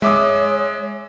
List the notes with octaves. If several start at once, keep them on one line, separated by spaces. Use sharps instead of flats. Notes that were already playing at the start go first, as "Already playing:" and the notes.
G#3 C#5 E5 D6 D#6